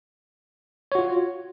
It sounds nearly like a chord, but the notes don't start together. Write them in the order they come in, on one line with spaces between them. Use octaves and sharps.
C#5 F#4 F4